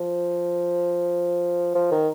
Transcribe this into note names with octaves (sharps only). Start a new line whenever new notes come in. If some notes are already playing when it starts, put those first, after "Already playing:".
Already playing: F3
F3
D#3